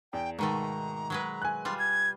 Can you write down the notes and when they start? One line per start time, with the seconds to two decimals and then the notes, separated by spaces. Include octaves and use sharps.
0.13 E2 G5
0.39 G#2 B2 D#3 A3 A#5
1.10 F#3 G#3 B4
1.42 G#5 F#6
1.65 G3 F4 C6
1.79 G#6